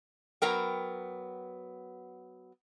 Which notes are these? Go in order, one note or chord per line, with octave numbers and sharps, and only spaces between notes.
F#3 B3 A#4 G5